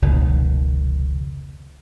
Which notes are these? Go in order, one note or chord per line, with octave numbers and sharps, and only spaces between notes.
F1 C#2 B2 D#3